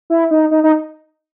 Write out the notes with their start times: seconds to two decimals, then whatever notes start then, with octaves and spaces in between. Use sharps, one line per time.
0.10 E4
0.31 D#4
0.51 D#4
0.64 D#4